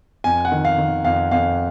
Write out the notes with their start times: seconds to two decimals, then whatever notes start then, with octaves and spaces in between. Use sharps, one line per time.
0.24 F2 G#5
0.45 F#5
0.52 D#3
0.65 F5
0.78 D#3
1.05 F2 F5
1.31 F2 F5